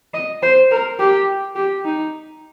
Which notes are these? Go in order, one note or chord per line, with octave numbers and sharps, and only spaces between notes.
D#5
C5
A#4
G4
G4
D#4